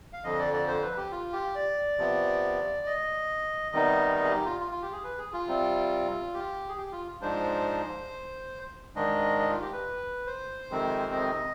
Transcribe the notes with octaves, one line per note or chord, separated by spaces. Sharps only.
F5
F2 D3 F3 D#5
D5
D5
C5
B4
G4
F4
G4
D5
C3 F3 B3
D#5
C3 D#3 G3 B3 D#4 D#5
D#5
G#4
G4
F4
F4
F4
G4
G#4
B4
G#4
F4
C3 G3 C4
G4
G#4
G4
F4
G#2 F3 G#3 D4 C5
G#2 D#3 G#3 D4 D#5
D#5
F4
G4
B4
C5
F2 C3 D#3 G#3 C4
D#5